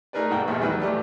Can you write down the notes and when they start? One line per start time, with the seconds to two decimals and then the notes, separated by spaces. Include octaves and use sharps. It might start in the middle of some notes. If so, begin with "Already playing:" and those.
0.13 A3 D#4 G#4 A#4 B4 D5
0.30 G#1 B2 A#3 F#5 G5
0.47 A#1 E2 A2 G3
0.61 D#3 F#3 G3 A#3 E4 B4
0.80 A3 G4 D5